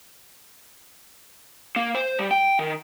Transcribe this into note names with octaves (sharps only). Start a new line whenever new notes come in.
A#3
C5
G3
G5
D#3